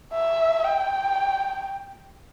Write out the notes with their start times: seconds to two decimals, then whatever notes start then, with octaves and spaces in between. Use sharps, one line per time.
0.14 E5
0.64 G5